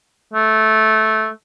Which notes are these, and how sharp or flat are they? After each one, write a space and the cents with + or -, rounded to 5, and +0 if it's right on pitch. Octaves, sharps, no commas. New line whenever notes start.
A3 -15